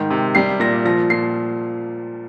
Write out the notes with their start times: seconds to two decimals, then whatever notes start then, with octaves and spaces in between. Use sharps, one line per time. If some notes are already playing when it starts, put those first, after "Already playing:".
Already playing: G#2 D#3
0.10 C3
0.35 G3 C7
0.60 A#2 A#6
0.85 F3 A#6
1.10 A#2 C7